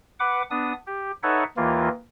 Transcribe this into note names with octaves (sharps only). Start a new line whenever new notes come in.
B4 F#5 D6
B3 D4 D#6
G4
D#4 A4 B4 C#5 E5 F#5
D#2 E3 A#3 F4